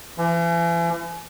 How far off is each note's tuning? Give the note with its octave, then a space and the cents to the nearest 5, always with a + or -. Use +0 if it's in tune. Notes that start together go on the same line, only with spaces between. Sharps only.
E3 +40